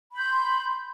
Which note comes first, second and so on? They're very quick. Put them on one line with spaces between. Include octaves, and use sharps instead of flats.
B5 G6 C6